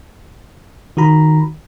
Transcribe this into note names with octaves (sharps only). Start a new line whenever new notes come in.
D#3 F#4 A#5 B5